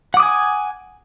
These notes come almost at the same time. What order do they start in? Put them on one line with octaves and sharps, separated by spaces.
F#5 D6 D#6 G#5